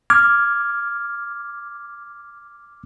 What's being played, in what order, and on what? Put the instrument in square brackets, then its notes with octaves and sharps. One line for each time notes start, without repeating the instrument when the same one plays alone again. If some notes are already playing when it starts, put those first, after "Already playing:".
[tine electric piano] D6 F6 G#6